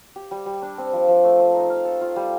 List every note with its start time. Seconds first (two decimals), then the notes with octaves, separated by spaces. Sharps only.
0.16 G4
0.31 G3
0.46 G3
0.62 D4
0.78 C4
0.93 F3
1.08 F3
1.24 A3
1.39 C5
1.55 D#4
1.70 F5
1.85 A4
2.01 F4
2.16 G3